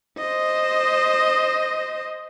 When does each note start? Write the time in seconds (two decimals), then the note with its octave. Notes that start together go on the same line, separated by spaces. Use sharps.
0.18 C5 D#5